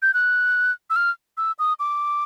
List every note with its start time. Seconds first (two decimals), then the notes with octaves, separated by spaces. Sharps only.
0.02 G6
0.14 F#6
0.90 E6
0.96 F6
1.37 E6
1.59 D#6
1.80 D6